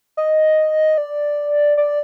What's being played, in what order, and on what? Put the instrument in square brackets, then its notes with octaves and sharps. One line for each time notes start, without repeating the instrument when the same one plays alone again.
[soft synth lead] D#5
D5
D5